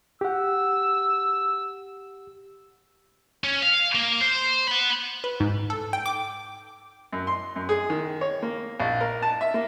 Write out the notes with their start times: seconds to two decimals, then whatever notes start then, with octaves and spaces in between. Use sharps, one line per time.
0.21 G4 F#5 E6
3.44 C#4
3.63 F5
3.95 A#3
4.21 C5
4.68 F#5 B5
5.24 B4
5.40 G#2
5.70 A4
5.93 G5
6.06 D6
7.13 F#2
7.27 C6
7.56 F#2
7.69 G#4
7.90 D#3
8.21 C#5
8.42 A#3
8.80 A#1
9.01 A#4
9.22 A5
9.41 E5
9.54 A#3